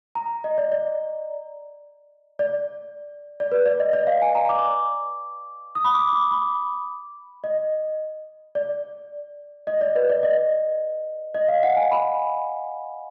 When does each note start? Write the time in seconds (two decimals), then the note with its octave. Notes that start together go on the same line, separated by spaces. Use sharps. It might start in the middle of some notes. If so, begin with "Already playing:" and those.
0.15 A#5
0.44 D#5
0.58 D5
0.72 D5
2.39 D5
3.40 D5
3.52 B4
3.66 D5
3.80 D#5
3.93 D5
4.07 F5
4.22 G#5
4.35 A#5
4.49 D6
5.75 D#6
5.85 B5
5.94 D6
6.12 D6
6.31 B5
7.44 D#5
8.55 D5
9.67 D#5
9.81 D5
9.96 B4
10.09 D5
10.23 D#5
11.35 D#5
11.48 F5
11.63 F#5
11.77 G#5
11.91 B5